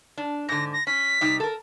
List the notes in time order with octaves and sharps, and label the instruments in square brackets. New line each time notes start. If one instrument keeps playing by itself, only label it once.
[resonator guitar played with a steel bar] D4
[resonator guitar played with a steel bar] G#2 D3 [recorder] A#6
[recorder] A#6
[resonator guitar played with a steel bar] C#4 [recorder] B6
[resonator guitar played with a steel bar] C3 G3 D#4
A4 A#4